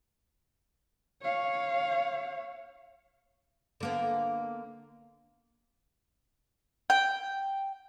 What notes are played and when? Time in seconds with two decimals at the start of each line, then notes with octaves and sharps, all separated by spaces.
1.22 C#5 F5
3.80 D3 A#3 B3
6.90 G5